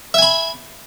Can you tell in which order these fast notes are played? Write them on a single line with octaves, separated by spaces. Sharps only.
E5 G#5 B5